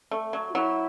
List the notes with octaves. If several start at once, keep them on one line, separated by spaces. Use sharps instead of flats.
A3
F#3
F#4
F#3 E4